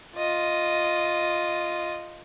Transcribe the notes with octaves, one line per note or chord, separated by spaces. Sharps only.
F4 D#5